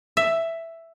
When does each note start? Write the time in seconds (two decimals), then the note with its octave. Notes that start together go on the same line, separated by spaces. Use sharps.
0.17 E5